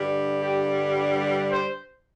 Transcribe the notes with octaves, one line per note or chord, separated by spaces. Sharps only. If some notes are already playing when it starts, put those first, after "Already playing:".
Already playing: G2 D3 G3
G4
C5